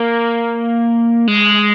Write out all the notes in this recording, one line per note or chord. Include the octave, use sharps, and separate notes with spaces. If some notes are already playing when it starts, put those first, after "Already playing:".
Already playing: A#3
G#3